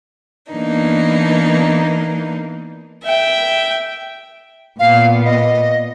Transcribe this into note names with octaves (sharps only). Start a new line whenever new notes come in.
E3 A#3 B3 D4 D#4
E5 G5
A#2 B3 F5
D#5